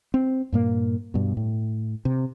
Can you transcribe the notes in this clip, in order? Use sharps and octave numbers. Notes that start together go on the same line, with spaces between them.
C4
G2 A#2 A#3
G2 B2
A2
C3